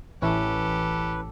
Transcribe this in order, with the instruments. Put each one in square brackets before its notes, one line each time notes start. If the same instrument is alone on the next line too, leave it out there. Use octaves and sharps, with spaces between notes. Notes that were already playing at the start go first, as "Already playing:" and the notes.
[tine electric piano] A1 [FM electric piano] E3 C#4 [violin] G4 A4 [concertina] B4